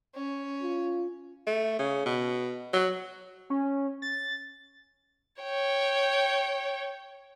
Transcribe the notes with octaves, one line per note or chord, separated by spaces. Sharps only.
C#4
F4
A3
C#3
B2
F#3
C#4
A6
C#5 G5